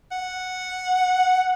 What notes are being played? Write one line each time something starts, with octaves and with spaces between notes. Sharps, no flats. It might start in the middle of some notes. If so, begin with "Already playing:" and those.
F#5